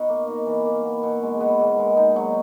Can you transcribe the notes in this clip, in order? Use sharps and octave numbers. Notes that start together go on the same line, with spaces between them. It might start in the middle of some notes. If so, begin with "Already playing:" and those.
Already playing: B2 D#4
A#3
D#4
E3
A#3
B3
B2
G#3
B3
A#2
G#3
D#4
F#3